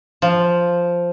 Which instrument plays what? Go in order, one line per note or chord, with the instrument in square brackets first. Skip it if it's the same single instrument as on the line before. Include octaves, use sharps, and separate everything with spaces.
[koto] F3